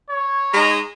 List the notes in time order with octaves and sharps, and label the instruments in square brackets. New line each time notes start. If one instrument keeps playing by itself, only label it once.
[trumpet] C#5
[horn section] G#3 D#4 A#5